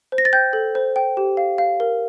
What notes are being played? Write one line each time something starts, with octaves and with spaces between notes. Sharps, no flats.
C5
A#6
A6
G5 G6
A4
C5
G5
G4
F5
F5
A#4